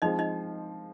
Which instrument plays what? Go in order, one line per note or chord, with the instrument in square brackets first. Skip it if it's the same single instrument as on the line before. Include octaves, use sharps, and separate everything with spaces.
[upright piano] F3 G#3 C4 [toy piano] D#4 D#5
[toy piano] D#4 D#5